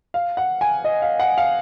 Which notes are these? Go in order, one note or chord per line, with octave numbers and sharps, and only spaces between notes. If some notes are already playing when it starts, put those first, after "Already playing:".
F5
F#5
G#5
D#5
F5
F#5
F5